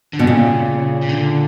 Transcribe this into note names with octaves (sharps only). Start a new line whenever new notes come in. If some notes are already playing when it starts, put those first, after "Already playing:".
D3
B2
A#2 C#3
C#3
D3